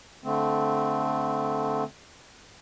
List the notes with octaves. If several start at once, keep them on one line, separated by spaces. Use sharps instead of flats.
D3 A3 C4